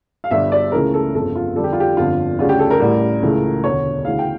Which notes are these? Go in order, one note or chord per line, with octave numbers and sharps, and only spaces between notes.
F5
G1 G2 D3 G3 E5
D5
C#2 C#3 E3 A3 C#4 A#4
A4
G1 F2 C#3 A4
F4
F2 D3 G3 A4
G4
F4
G4
G1 F2 D3 F4
D2 C#3 G3 C#4 F4
G4
A4
A#4
A1 A2 G3
C#2 C#3 E3 A3
E1 D2 D3 C#5
D2 C#3 E3 F5
G5